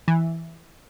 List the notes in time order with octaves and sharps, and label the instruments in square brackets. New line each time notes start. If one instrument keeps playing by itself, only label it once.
[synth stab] E3